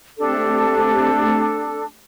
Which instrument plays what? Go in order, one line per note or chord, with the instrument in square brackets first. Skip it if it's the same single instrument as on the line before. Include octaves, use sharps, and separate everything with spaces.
[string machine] A3 C4 G4 [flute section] D4 A4